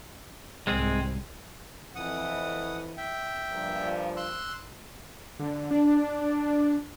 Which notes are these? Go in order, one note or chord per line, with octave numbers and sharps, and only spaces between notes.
C2 G#2 G#3 C4 G#4
F2 E3 F#5 D#6
E5 G5
G2 A#2 F3
C6 E6 F#6
D3
D4